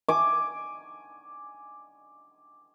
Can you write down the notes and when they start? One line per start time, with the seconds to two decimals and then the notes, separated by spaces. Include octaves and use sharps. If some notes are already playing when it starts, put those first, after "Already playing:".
0.09 G#5 D6